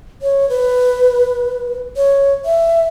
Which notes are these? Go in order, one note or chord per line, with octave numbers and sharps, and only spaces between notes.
C#5
B4
C#5
E5